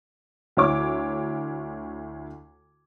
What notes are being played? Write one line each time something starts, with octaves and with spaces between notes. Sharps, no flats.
D2 E4 C#5 D6